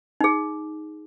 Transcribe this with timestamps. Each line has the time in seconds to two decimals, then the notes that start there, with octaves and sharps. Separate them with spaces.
0.21 D#4 G#4